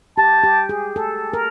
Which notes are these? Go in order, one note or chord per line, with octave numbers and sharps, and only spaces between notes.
G4 A5
G4
G#4
A4
A#4